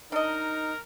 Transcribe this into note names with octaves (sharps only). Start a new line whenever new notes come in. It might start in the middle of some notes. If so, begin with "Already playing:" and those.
D4 D#4 A#4 D#5